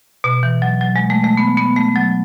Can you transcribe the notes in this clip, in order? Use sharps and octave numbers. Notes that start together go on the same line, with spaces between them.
B2
E3
F#3
F#3
G#3
A3
A3
B3
B3
A3
F#3